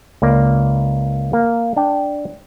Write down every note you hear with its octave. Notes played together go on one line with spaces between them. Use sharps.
C#2 A#3 D5
A#3
D4 G5